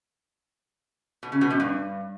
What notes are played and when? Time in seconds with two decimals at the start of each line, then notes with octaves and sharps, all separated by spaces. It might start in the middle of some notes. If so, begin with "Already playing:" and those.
1.23 B2
1.32 C#3
1.41 B2
1.51 F#2
1.60 G2